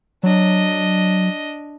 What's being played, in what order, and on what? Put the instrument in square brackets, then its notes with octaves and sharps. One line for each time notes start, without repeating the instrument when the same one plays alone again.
[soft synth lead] F#3 [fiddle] D4 D#5